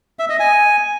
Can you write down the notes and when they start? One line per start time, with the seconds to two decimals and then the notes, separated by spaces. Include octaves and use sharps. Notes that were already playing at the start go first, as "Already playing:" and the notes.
0.19 E5
0.29 D#5
0.40 G#5